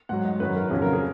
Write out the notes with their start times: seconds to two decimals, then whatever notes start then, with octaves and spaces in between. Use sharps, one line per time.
0.09 G#2 F#3 F#5
0.25 D#5
0.40 F#2 D#3 F#3 B4
0.56 A#4
0.71 F2 C#3 F#3 G#4
0.82 A#4
0.93 G#4